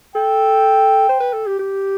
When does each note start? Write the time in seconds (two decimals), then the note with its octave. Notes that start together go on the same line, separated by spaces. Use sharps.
0.15 A4 G5
1.09 C5
1.20 B4
1.33 A4
1.46 G4
1.59 G4